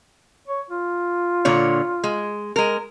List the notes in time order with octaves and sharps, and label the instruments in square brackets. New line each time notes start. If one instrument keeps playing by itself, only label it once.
[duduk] C#5
F4
[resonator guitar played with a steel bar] A#2 D3 C#5
G#3
G#3 A#4